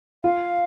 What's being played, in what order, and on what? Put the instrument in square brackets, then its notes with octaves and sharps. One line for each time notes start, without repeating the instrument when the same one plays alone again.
[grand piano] F4 [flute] F5